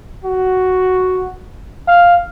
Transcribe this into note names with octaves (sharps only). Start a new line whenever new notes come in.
F#4
F5